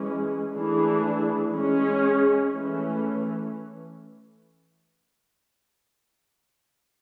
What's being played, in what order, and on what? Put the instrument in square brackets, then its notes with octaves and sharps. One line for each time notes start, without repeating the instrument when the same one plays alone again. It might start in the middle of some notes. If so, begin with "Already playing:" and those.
Already playing: [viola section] E3 G#3 C#4 G#4
E3 A3 D4 G#4
G#3 C#4 G#4
E3 A3 C#4